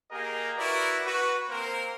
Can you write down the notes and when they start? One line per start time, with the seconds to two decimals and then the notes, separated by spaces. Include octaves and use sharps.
0.11 A#3 G4 G#4 A#4 D#5
0.57 E4 F#4 A#4 B4 D5
1.04 F#4 B4
1.49 A#3 C4 A#4 C5